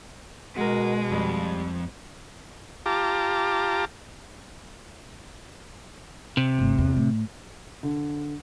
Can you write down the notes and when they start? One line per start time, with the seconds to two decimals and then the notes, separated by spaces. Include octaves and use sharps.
0.56 B2 G#3 F#4 A#4
1.12 F2 G3
2.86 F4 G4 A5 A#5 D6
6.37 C3
6.59 G1 A3
6.78 E2
6.96 A2
7.83 D3